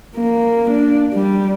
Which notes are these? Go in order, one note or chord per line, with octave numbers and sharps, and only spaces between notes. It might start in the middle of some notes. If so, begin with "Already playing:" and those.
A#3
D4
G3